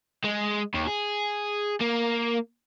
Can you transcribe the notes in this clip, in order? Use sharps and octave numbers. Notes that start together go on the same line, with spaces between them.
G#3
D#2
G#4
A#3